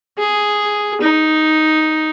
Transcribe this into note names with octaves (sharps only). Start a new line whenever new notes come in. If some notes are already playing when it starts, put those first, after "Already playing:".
G#4
D#4